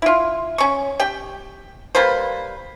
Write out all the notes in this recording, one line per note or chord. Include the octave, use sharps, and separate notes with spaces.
E4 F4
C#4 C#6
G4 G5
G3 A#3 B4 C5